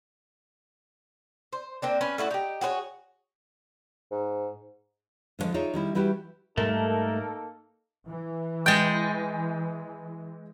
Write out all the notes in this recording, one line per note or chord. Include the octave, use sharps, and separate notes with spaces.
C5
A#3 C4 D4
C#4 B4
A3 E4 F#4 D5
D#4 G4
F#4 G#4 B4 C#5
G#2
A2 D3 D#3 F3 G#3
D#4 F4 G#4 C#5 D5 E5
D#3 G3 E4
E3 G3 E4 F#4 G4
G#2 G3 A3 A#3 D#4 A4 A#4
E3
G#3 G5 G6 A6